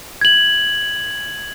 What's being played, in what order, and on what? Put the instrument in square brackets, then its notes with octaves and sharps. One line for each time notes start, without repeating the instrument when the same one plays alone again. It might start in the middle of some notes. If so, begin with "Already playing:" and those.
[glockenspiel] G#6 F#7